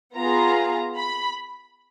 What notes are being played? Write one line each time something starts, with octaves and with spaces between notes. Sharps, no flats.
B3 F4 G#4 A#5
B5